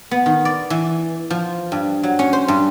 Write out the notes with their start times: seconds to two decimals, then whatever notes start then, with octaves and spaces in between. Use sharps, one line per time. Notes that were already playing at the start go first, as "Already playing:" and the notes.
0.11 B3
0.26 D#3
0.45 D5
0.70 E3
1.30 F3
1.72 G2
2.03 F#3
2.19 C#4
2.33 C5
2.48 G2